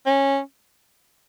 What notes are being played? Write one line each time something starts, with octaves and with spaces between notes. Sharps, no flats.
C#4